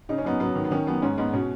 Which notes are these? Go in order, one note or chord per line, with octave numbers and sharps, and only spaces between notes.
C#3 D#4
C#4
F#2 B3 D#4
F#3 B3
D#3
B3
D#3 C#4
F#2 B3
G#2 C#4
G#2 B3 D#4
B2 C#4